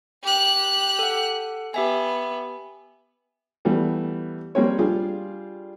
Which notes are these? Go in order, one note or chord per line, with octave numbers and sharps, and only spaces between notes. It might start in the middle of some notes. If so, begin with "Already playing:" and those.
G4 F#6
A4 F#5
B3 G4 E5 G#5
E3 G3 A3 B3
G3 A#3 C4 G#4 C#5
G3 D4 F4 G#4 D5